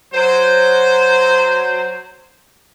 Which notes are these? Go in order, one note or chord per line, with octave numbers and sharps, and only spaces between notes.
F#3 C5